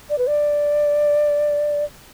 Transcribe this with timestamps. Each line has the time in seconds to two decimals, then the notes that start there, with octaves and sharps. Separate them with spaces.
0.10 D5
0.18 B4
0.27 D5